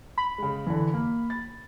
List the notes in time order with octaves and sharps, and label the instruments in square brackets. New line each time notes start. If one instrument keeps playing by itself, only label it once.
[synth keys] B5
[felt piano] C#3 G#3
D3 E3
A#3
A6